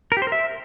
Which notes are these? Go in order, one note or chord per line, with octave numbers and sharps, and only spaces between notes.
A#4
G4
C5
A#4
E5